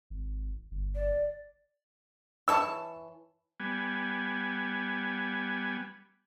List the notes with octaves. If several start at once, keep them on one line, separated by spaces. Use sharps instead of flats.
G#1
G1
D5
E3 C#5 A5 E6
G3 B3 G#5